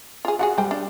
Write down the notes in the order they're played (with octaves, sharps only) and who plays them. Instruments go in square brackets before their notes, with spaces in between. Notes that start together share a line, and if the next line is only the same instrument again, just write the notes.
[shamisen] F4 G#4
[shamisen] G3 F#4 G#4 [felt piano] F#5
[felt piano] G3 [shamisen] C5 G5
[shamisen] D4